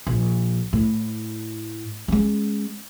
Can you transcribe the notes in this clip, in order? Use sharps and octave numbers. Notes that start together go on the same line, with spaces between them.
A#1
A2
G#3 C#4